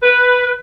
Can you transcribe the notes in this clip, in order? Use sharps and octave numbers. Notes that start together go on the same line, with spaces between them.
B4